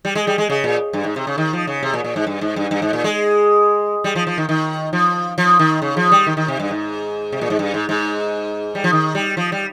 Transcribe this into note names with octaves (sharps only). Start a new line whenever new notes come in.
G3
G#3
G3
G#3
C#3
A#2
G2
G#2
C3
C#3
D#3
F3
C#3
C3
A#2
A#2
G#2
G2
G#2
G2
G2
G#2
A#2
G#3
G3
F3
F3
D#3
D#3
F3
F3
D#3
C#3
F3
G3
D#3
D#3
C3
G2
G#2
C3
A#2
G#2
G2
G#2
G#2
G3
F3
D#3
G3
F3
G3